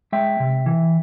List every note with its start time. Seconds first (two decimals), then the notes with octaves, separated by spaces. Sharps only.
0.12 G#3 E5 G5
0.40 C3
0.66 E3